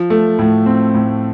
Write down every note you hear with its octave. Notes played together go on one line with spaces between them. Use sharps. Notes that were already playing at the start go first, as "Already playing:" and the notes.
Already playing: F3
A3
A2
C4
A2